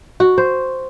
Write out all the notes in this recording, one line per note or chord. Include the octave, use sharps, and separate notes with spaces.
F#4
C5